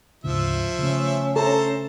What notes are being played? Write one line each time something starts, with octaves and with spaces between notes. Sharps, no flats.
D2 G#2 C#3 F3 E5
C#3 A3 C#4
A4 C5 A5 A#5